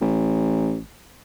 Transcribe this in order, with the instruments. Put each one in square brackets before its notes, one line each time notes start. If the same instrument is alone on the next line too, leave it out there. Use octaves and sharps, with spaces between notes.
[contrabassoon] A1